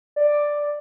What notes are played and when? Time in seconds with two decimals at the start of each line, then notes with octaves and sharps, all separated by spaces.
0.16 D5